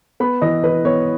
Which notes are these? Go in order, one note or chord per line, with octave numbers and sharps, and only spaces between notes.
B3 B5
E3 D#5
E3 B4
B3 C#5